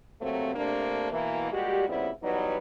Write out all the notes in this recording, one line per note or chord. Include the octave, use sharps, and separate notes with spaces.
C3 F#3 A3 A#3 C4
C3 A3 A#3 D4
B2 E3 A#3
A#2 G3 G#3 F#4 G4
A#2 C#3 G3 B3 C4 E4
E3 F#3 G3 B3 D#4 B4